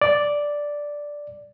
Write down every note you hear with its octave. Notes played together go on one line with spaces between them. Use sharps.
D5